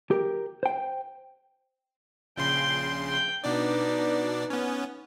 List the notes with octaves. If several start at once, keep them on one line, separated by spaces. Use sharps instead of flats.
G4 A#4
C5 G5
A#1 C#3 G5 C6
G5
B2 D4 D#4 B4 D5
B3 C#4